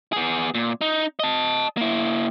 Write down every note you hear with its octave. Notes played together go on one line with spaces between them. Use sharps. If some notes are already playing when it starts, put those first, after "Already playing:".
B3 G#4
A#2
D#4
D#5 A5
A#3 E4